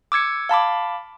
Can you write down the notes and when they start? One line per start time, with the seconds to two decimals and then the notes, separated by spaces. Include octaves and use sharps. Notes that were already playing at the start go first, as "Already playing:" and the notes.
0.12 D6 E6 G#6 C#7
0.49 F5 A5 B5 D6